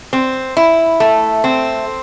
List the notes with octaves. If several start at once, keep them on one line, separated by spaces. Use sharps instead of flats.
C4
E4
A3
C4